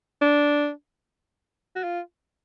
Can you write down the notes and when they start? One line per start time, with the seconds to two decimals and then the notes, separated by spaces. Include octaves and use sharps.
0.21 D4
1.75 F#4
1.84 F4